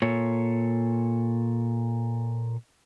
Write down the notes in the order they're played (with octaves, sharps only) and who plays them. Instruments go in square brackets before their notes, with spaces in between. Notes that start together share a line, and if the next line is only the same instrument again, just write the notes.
[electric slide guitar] A#2 A4 C#5